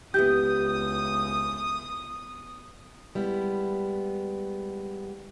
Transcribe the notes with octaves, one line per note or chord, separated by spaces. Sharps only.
C#2 B3 E4 G4 D#6 G6
G3 G#3 B3 E4